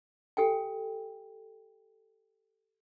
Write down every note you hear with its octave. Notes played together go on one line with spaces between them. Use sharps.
G4 A4 G5 G#5